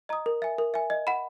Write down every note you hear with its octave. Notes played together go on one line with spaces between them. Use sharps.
D#5 A#5 D#6
A#4
E5 G#5
A#4
E5 G#5
D#5
F#5 B5